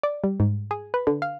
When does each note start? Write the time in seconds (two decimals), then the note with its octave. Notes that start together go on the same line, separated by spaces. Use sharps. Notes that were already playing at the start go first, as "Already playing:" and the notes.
0.03 D5
0.24 G3
0.40 G#2
0.71 G#4
0.94 B4
1.07 D3
1.22 F5